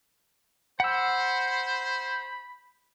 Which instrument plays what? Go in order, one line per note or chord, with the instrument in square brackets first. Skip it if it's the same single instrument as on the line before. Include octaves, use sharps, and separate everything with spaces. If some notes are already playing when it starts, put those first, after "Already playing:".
[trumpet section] C5 [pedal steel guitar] F#5 E6 [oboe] B5